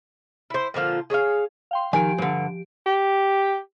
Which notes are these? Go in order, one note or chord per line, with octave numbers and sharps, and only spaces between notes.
E4 C5
A#2 D3 F3 F4
G#4 C#5 D5 F5
F5 G5 C6
D#3 F3 G4 G#5 D7
G2 D3
G4